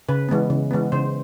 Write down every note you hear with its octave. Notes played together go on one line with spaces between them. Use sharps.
C#3 B4
E3 G#3 B3
C#3
E3 G#3 B3
C#3 C5